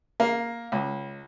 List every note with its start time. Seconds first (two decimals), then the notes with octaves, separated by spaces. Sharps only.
0.20 A#3
0.72 C#2